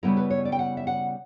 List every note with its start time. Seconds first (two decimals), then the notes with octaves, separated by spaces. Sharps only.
0.03 C#3 G3 B3 E4 A#4
0.17 B4
0.30 C#5
0.45 D5
0.52 G5
0.59 F#5
0.77 E5
0.87 F#5